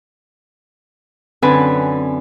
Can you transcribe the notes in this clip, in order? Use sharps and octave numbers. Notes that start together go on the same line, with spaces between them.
F#2 D3 C4 B4 G#5 B5